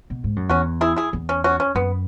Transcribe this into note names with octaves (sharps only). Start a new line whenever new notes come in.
B2
G#2
F#2
E2 C#4 F#4
E4 G#4
E4 G#4
E2
C#4
C#4 F#4
C#4
F#2 B3